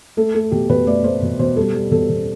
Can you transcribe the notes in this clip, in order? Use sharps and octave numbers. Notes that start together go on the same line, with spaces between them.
A3 A4
A3 A4
B2 G4
B2 B4
A3 D5
A3 C5
B2
B2 C5
G3 A4
G3
B2 A4
B2